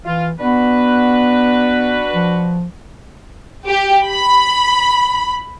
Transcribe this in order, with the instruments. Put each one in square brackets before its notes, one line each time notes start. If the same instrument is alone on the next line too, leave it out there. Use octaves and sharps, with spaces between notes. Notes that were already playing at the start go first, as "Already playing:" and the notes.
[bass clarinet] E3 [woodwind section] F4
[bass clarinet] B3 [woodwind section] D4 F#4 B4
[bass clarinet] F3
[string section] G4
B5